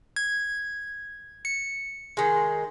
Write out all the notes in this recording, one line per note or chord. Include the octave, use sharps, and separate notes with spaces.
G#6
C#7
D#3 G#3